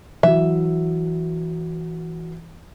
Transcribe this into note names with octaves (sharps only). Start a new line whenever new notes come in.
E3 F#3 E5